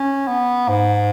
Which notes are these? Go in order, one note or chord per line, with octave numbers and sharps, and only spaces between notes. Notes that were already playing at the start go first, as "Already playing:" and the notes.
Already playing: C#4
B3
G#2